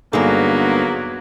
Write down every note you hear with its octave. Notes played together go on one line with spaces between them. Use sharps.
G2 D3 F#3 A#3 B3 D#4 G#4